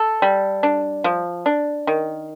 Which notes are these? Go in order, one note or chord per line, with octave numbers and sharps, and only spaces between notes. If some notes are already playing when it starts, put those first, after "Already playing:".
Already playing: A4
G3
D4
F3
D4
D#3